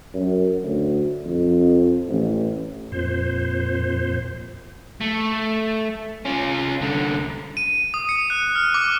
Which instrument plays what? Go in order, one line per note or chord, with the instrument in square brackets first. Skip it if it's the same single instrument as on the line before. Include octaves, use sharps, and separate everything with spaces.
[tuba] F#2
D2
F2
A1
[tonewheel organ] F2 A#2 C5
[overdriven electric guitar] A3
C#4 F4
C2 D3
[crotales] D#7
D#6
C#7
F#6
F6
D6